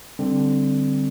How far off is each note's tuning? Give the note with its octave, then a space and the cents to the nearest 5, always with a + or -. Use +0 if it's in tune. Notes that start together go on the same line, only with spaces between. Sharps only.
D3 +0 G3 +0 C4 +0